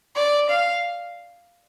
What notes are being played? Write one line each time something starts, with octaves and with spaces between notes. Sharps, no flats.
D5
F5